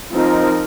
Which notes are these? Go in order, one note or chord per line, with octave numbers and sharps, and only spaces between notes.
F3 C4 D#4 A#4